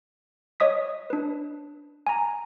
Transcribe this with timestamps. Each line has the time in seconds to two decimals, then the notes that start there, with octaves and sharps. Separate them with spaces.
0.60 C#5 D#5 D#6 B6
1.10 D4 B4
2.07 G#5 A#5